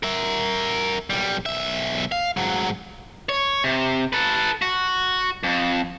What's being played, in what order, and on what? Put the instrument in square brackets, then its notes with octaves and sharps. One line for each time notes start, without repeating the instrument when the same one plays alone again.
[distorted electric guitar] A#4 E5
B1 G3
B1 E5
F5
G#2 F#3
[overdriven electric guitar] C#5
C3
A4 B4
F#4
F2